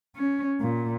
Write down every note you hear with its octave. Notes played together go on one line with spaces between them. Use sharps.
C#4
A#2